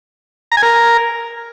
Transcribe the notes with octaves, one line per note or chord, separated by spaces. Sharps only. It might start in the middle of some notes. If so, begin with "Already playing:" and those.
A#5
G#5
A#4